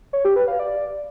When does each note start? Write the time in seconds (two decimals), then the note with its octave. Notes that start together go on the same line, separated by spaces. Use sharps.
0.13 C#5
0.25 G4
0.36 B4
0.48 F5
0.59 D5